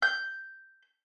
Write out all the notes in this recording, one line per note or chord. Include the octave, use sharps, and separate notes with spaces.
G6